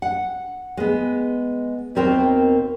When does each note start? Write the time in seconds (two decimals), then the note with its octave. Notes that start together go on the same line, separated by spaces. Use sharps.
0.02 F#5
0.77 G#3 B3
1.95 D#2 B2 C4 A#4 C5 G5